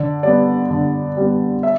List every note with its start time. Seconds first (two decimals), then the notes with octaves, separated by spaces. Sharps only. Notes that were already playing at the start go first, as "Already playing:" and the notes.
Already playing: D3 D5
0.23 G3 B3 D5
0.70 D3
1.17 G3 B3
1.63 E5